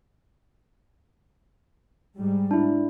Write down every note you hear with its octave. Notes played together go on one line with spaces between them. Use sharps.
G#2 G3
D4 E4